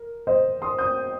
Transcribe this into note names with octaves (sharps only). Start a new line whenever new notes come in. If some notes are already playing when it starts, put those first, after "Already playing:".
Already playing: A#4
C5 D#5
C6 D#6
D#6 G6